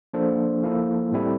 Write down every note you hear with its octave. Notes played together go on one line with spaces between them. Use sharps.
F3 A#3 D4 A4 C5
F3 A#3 E4 A4
A2 G3 C4 E4 A4